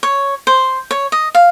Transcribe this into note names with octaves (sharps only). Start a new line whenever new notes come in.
C#5
C5
C#5
D#5
F5